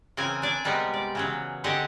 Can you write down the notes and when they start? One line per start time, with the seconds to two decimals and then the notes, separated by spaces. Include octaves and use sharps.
0.17 C#3 E3 C4 A#4 G#5
0.42 D4 D5 G#5
0.64 C3 G3 G#3 B3 A#4
0.94 D5
1.15 C#3 E3 F#3
1.64 D3 C4 G4 G#4 D#5 F#5